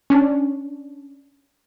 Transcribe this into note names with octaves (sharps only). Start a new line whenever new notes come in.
C#4 D4